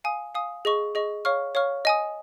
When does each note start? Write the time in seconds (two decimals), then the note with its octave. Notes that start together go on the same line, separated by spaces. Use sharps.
0.04 F5 G#5 D#6
0.35 F5 G#5 D#6
0.65 G#4 D#5 C#6
0.95 G#4 D#5 C#6
1.25 C#5 F5 C#6 F6
1.55 C#5 F5 C#6 F6
1.85 D#5 G#5 D#6